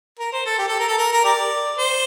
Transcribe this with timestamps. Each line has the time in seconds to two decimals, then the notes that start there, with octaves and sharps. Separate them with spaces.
0.19 A#4
0.33 C5
0.46 A4
0.59 G4
0.68 A4
0.79 A#4
0.88 A4
0.98 A#4
1.12 A#4
1.24 G4 A#4 D5
1.78 C5